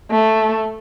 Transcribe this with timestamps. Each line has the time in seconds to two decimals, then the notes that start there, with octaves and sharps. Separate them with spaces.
0.11 A3